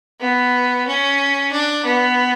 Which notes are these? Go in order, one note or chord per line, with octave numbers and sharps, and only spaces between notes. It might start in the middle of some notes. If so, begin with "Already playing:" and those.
B3
C#4
D4
B3